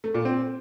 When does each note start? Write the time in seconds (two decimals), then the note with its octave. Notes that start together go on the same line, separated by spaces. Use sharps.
0.04 A3
0.14 A#2
0.25 C4